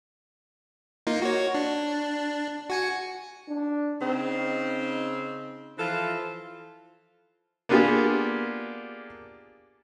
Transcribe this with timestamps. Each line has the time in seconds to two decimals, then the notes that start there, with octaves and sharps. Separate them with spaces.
1.07 A#3 D#4 F4
1.22 F#4 C#5
1.55 D4
2.70 F#4 G#5 C#7
3.49 D4
4.00 C#3 C4 D#4
5.78 E3 F3 F4 A4
7.69 A#3 B3 D4 F4 G4 G#4